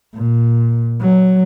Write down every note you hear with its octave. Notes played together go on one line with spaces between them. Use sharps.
A#2
F#3